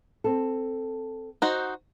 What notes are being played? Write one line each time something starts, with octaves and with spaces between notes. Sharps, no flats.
C4 A4
D#4 F#4 C5